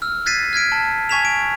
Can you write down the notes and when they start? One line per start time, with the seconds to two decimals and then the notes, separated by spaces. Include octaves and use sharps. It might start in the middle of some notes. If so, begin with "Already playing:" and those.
0.02 E6 F6
0.26 F#6 G#6 A6 B6 C7 D#7
0.53 F6 G#6 B6 D7
0.72 A5
1.09 G#5 C#6 G#6 B6 E7 F7
1.25 D7